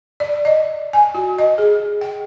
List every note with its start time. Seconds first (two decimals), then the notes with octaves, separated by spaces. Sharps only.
0.20 D5
0.45 D#5
0.93 G#5
1.15 F#4
1.38 D#5
1.58 G#4
2.01 G5